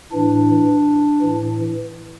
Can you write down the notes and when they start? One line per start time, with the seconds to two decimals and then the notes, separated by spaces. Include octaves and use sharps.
0.12 A2 E3 D4
1.22 A2 E3